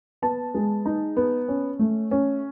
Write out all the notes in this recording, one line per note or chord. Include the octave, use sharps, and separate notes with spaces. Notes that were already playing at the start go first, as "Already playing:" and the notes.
B3 A5
G#3
D#4
B3
C#4
A3
C#4